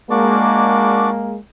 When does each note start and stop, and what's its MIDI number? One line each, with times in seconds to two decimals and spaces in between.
0.10 1.37 56
0.10 1.37 58
0.10 1.10 62
0.10 1.10 66
0.10 1.10 74